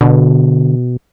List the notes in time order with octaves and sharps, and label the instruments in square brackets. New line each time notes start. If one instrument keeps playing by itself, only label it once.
[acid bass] B2 [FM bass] D3